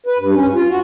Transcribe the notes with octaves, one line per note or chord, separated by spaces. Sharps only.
B4
G2
C#4
F4
F#4